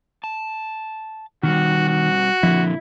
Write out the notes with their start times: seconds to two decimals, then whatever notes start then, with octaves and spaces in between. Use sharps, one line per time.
0.24 A5
1.43 B2 D#3 G3 F#4
1.88 F#4
2.43 A#2 D3 F3 E4